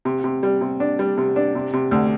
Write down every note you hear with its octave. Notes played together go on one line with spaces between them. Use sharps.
C3
C3
G3
C3
D4
G3
C3
D4
C3
C3
D2